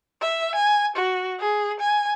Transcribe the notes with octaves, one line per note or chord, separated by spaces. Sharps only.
E5
G#5
F#4
G#4
G#5